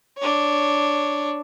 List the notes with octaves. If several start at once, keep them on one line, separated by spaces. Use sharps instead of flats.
D4 C#5